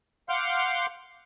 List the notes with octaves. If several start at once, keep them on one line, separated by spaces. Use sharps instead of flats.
F5 F#5 C6 D6 F6 G6